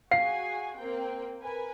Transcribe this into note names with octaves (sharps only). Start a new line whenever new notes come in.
F#4 G#4 F5 G#5 C7
A#3 C4 G5
A#4 B4 G#5